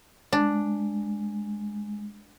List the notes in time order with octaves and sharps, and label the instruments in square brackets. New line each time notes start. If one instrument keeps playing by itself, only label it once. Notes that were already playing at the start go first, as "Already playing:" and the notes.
[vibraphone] G#3 [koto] D4